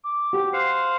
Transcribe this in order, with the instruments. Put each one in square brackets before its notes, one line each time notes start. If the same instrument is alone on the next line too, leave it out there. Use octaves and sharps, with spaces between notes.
[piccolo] D6
[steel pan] F#4 G4
[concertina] C5 F5 F#5 [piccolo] C7